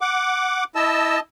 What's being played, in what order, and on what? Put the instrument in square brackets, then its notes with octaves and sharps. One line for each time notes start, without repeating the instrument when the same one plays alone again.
[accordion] F#5 D6
[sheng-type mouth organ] E4 E6 [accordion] D#5 A5